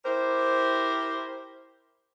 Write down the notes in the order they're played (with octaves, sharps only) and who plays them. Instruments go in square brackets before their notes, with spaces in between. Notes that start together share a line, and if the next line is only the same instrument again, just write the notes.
[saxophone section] E4 G4 A#4 C5